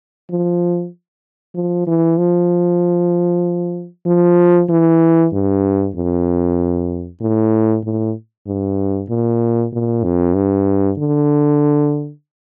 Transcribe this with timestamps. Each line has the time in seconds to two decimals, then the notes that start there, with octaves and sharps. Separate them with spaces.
0.31 F3
1.55 F3
1.87 E3
2.18 F3
4.06 F3
4.69 E3
5.33 G2
5.96 F2
7.21 A2
7.84 A2
8.47 G2
9.10 A#2
9.73 A#2
10.04 F2
10.35 G2
10.98 D3